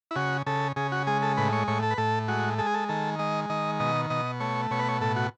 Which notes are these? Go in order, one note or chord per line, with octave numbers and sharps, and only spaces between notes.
E4
C#3 F#4
C#3 A4
C#3 G#4
F#4
G#3 G#4
A4
A2 B4
C#5
A2 C#5
A4
B4
A2 A4
G#3 F#4
G#3 A4
G#4
A4
D#3 A4
G#3 D#5
D#3 D#5
B2 D#5
B2 D#5
A3 C#5
B2 C#5
B4
C#5
A2 A4
F#4